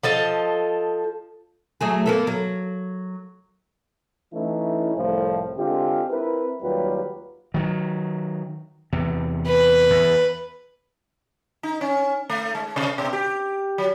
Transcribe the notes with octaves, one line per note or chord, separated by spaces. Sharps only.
F3 A4 D#5 A5
F#3 A3 G#4
A#3 B3 A4
F#3
E3 A3 C#4 D#4 E4
C2 A2 F3
D3 G#3 C4 F4 G4
C4 E4 A#4 B4
D#2 F#3 G3 F4 G4 B4
D#3 F#3
E2 C3
B4
E2
D#4
C#4
A3
G#3
C3
B2
G4
F#3